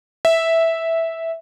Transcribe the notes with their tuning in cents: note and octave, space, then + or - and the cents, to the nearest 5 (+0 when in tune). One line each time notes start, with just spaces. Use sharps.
E5 -5